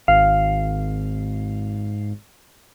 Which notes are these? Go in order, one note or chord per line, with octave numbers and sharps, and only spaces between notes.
G#1 F5